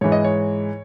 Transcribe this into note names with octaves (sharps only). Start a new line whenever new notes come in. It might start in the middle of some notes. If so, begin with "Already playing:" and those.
G#2 E3 G#3 C#5
D#5
C#5